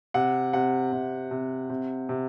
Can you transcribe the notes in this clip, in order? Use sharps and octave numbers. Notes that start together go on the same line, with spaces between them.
C3 F#5
C3 F#5
C3
C3
C3
C3